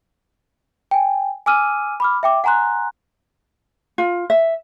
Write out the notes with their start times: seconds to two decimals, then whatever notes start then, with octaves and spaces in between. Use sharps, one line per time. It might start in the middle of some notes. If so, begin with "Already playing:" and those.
0.91 G5 G#5
1.46 G#5 D6 E6 F6 D#7
2.00 B5 D6 F6
2.23 E5 G5 D6
2.44 F#5 G#5 A#5 C6 F#6
3.98 F4
4.30 E5